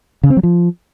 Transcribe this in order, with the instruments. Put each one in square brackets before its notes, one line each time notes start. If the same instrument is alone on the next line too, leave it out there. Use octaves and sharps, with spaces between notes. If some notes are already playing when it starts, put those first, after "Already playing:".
[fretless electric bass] C#3
C4
F#3
F3